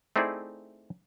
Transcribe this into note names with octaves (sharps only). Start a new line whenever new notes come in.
A3 C4 D#4 E4 G#4 D5